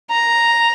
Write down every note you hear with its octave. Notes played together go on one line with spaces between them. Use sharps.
A#5